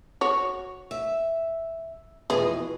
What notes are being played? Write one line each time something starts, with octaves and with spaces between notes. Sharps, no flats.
F#4 C#5
E5
F2 B2 E3 G#4